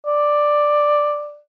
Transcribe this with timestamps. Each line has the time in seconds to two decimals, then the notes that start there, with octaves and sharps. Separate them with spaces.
0.06 D5